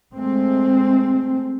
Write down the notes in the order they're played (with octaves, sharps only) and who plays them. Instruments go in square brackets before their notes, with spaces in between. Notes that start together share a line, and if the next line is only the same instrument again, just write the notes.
[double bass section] G#3 A3 C4